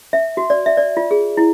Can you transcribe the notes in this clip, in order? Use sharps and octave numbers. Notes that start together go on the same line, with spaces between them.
E5
F#4
D5
E5
D5
F4
G#4
E4